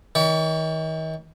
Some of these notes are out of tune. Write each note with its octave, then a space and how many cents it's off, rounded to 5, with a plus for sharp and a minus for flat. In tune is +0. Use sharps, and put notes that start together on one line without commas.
D#3 +40 C#5 +45